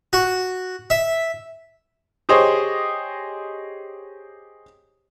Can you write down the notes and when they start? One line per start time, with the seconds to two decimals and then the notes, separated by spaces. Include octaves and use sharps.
0.13 F#4
0.90 E5
2.29 G4 G#4 C5 C#5 D#5